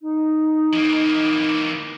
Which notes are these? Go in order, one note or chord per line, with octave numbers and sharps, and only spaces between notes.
D#4
E3 A#3